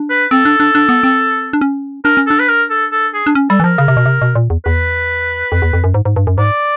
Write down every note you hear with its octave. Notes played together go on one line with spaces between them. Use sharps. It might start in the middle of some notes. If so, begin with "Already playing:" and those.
Already playing: D4
B4
C4 A4
D4
D4
D4
B3
C4
D4
C#4
D4 A#4
C#4
D4 A4
B4
A#4
A4
A4
G#4
D4
C#4
G3 A4
E3
F3 A#4
C#3
C3
B2
C3
B2
A#2
E2
E2 B4
F2
E2
F2
F#2
G#2
G#2
G2
F#2
G#2 D5